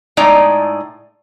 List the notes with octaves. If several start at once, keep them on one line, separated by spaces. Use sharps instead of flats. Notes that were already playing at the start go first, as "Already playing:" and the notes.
A2 G#3 D#4 D5